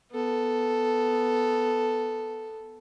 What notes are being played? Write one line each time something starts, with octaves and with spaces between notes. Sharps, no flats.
B3 A4